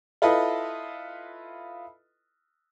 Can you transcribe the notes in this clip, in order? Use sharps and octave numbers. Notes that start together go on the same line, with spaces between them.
E4 F4 A4 B4 D#5